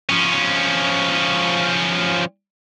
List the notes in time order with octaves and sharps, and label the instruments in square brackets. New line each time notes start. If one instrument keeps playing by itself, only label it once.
[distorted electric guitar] F3 C#4